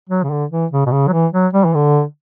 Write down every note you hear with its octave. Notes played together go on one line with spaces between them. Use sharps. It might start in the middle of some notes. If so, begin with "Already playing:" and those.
F#3
C#3
D3
E3
C#3
B2
C#3
F#3
E3
F#3
G3
E3
D3